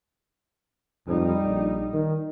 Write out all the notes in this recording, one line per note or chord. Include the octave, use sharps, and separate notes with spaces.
F2 G3 D#4
A#1
D#3